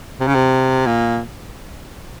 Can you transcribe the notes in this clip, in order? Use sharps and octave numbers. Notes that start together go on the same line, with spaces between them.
C3
C#3
C3
A#2